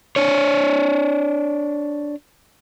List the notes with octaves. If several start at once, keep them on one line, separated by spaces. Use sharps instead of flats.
D4 C#5